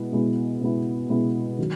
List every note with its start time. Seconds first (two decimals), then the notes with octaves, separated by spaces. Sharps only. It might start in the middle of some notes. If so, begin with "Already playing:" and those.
Already playing: B2 G#3 B3 E4
0.12 B2 G#3 B3 E4
0.61 B2 G#3 B3 E4
1.10 B2 G#3 B3 E4
1.59 D#3 F#3